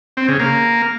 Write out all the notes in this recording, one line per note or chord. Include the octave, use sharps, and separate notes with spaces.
C4
C#3
A#3